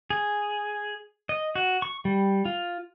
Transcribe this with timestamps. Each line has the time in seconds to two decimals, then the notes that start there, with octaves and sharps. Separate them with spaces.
0.10 G#4
1.29 D#5
1.55 F#4
1.82 C#6
2.05 G3
2.45 F4